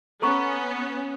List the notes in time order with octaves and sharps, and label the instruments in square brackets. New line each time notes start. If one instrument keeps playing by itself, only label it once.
[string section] B3 C#4 [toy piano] A4 A#5 C#6